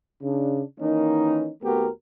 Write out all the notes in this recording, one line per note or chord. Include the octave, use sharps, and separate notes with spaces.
C#3 D4
D#3 E3 A#3 C#4 D#4
D#2 A3 B3 F#4 G4 A#4